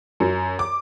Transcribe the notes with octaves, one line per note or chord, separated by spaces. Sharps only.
F#2
D6